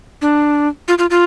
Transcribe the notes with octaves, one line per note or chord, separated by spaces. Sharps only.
D4
F4
F4
F4